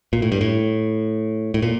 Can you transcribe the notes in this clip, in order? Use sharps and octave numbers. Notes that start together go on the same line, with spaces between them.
A#2
A2
G2
A2
A2
A#2